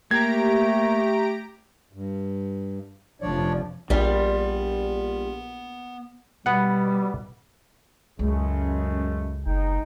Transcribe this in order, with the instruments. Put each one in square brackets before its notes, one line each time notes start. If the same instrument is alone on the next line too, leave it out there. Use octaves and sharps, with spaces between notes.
[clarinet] A3 [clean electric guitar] A#3 [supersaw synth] G4 A#5 D7 [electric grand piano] G#6
[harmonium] G2
[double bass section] F1 F3 [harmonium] D4 C#5 D5
[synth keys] A#1 [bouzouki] G3 F4 [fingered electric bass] B3
[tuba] B2 [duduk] G3 [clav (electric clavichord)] B3 F#5
[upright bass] C#2 [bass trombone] F#2 [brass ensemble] C#3 G#3 A3
[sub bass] F#1 [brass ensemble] G#3 D#4 G5